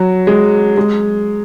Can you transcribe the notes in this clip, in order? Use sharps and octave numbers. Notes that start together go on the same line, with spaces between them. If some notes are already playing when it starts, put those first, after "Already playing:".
Already playing: F#3
G#3
G#3